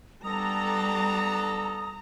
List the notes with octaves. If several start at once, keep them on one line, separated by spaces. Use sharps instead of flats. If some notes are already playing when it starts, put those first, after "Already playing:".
G3 B3 D4 A4 A#5 D#6